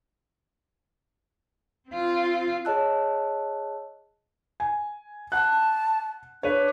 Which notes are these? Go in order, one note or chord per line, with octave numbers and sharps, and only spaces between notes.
C4 F4
G#4 C#5 D#5 A5 E6 F#6
G#5
F#5 A5 F#6
D4 B4 C#5